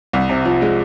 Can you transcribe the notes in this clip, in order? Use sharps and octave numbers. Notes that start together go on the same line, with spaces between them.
C2
C3
F3
G#3